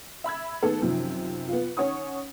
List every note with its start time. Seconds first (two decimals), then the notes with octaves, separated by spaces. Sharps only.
0.24 E5 B5 E6 G#6
0.63 D#3 A3 B3 G#4 A4
0.82 F#2 C3 D#3 F3
1.48 B3 F4
1.77 D#3 C#4 C#5 F#5 C#6 D#6